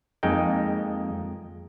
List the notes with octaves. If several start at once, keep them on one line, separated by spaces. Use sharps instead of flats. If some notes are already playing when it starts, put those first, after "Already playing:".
F2 G#3 A#3 D#4 G5